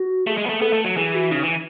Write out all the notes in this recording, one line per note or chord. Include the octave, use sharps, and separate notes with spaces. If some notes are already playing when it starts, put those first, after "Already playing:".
Already playing: F#4
A3 G#4
G#3
B3
A3
B3 A4
A3
F#3
E3 G#4
F#4
C#3 D#4
E3